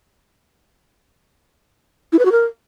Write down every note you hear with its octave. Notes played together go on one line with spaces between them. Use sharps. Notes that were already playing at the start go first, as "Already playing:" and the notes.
E4
B4
F#4
A#4